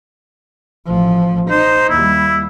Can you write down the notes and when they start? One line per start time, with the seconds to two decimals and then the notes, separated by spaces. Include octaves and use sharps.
0.85 A1 F3
1.50 D#4 C5
1.89 D#2 G3 E4